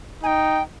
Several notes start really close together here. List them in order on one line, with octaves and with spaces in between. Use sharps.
D#4 G#5 G5